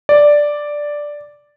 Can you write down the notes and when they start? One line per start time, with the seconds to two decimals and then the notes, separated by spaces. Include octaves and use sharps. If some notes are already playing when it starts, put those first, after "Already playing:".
0.09 D5